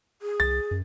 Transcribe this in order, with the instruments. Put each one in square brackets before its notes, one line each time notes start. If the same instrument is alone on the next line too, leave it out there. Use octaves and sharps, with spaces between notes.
[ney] G#4
[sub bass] C2 [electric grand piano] A6
[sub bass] F#2